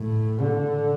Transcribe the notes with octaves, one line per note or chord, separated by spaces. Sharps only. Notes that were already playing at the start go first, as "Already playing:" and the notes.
Already playing: A2
D3